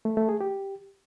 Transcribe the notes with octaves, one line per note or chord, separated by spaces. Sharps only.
A3
A3
G#4
G4